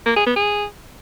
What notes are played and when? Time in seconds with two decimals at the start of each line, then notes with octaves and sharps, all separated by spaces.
0.06 A#3
0.16 G#4
0.26 B3
0.36 G#4